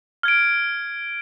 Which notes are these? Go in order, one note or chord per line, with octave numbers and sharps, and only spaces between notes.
F6 G#6 D7